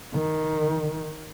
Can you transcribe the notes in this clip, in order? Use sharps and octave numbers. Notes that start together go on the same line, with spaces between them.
D#3